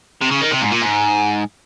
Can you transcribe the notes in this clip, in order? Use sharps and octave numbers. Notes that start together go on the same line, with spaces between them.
C3
C#3
D#3
C3
G#2
A#2
G#2